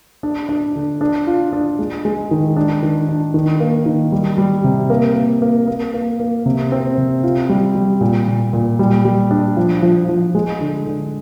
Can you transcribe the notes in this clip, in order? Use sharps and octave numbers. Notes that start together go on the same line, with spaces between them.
D4
D4
D3
D4
F4
D4
G#3
G#3
D#3
D4
D#3
D4
D#3
A#3
D#3
G3
G3
C3
A#3
A#3
A#3
A#3
A#3
A#3
C3
C4
C3
F4
G3
G3
A#2
A#2
A#2
G3
G3
D4
F3
F3
F3
G#3
D3
D3